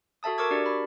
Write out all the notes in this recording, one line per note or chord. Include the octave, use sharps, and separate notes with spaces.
F#4 A4 E5 A5 D#6
A#4 C#6 D6 E6 G#6
D4 F#4 G4 A#4 D5
B5